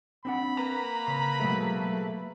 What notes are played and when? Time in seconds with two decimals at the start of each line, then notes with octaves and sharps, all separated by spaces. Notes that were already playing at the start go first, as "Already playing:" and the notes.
0.25 C4 D4 F#5 B5
0.57 A#3 B4 A#5
1.07 C#3 C6
1.40 B2 F#3 G#3 A3